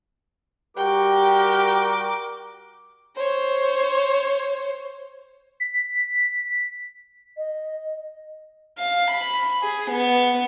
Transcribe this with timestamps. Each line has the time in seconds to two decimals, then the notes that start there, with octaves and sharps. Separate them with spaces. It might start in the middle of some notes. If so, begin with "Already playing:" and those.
0.77 G3 F#4 G4 A#4 G5 D6
3.16 C5 C#5
5.60 B6
7.37 D#5
8.79 F5
9.11 B5
9.62 G#4
9.91 B3